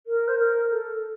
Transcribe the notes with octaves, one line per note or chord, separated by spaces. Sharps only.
A#4
C5
A#4
A4